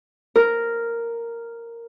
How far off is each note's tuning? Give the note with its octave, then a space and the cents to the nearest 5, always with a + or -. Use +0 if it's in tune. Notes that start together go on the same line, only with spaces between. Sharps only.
A#4 -5